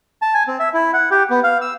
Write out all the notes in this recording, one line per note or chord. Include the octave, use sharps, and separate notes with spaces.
A5
G#5
C4
E5
E4
F#5
G4
B3
F5
E6